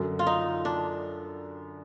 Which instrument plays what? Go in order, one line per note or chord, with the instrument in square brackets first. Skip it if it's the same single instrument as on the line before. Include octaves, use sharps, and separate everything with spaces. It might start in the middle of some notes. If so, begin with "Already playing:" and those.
Already playing: [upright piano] F#2 D3 F#3
[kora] F4
D#4
D4